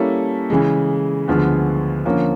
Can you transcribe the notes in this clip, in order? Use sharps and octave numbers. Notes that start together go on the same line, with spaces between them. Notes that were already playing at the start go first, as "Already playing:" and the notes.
Already playing: G3 A#3 C#4 E4 A4
C#3 E3 G#3
D2 D3 F3 G#3 B3
D3 F3 A#3 C#4